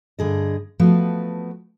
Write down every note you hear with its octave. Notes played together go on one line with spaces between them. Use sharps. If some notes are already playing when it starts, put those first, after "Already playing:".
G2 D3 G#4 D#5
F3 A3 B3 F#4 B4